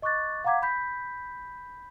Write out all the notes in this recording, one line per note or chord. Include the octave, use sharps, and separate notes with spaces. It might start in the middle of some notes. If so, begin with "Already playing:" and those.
D#5 C#6 D6 F#6 A6
F5 F#5 A#5 D6 G#6 B6
B5 G6 B6